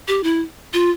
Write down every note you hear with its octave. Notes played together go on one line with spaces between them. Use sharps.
G4
E4
F4